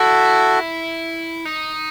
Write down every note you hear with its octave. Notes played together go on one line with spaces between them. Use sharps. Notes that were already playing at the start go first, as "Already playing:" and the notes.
Already playing: E4 F#4 A4
D#4